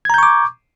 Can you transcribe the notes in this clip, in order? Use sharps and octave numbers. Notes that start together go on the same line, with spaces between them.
A#5 C#6 D6 G6 G#6